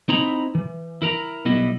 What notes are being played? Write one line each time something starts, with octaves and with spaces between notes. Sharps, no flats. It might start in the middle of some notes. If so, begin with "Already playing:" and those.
C4 D#4 E4 A#5 B5
E3
E4 A#4 A#5
B1 G3 B3 E4 D#5